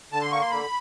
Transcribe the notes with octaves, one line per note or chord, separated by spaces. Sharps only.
D3 A5
C6
A#3 C#6
C6
D3 B5